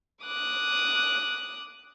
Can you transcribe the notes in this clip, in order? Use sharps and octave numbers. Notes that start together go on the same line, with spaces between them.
D6 D#6 F#6